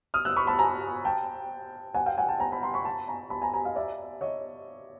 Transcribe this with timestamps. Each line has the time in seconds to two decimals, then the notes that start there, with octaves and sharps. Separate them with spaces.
0.14 D#6 F6
0.25 E6 F#6
0.36 B5 C#6
0.47 A5 B5
0.59 G#5 A#5
1.05 G5 A5
1.94 F#5 G#5
2.06 F5 G5
2.18 F#5 G#5
2.28 G5 A5
2.40 G#5 A#5
2.52 A5 B5
2.62 A#5 C6
2.74 B5 C#6
2.85 A5 B5
3.08 G#5 A#5
3.30 A5 B5
3.42 G#5 A#5
3.54 G#5 A#5
3.64 D#5 F5
3.76 D5 E5
4.21 C#5 D#5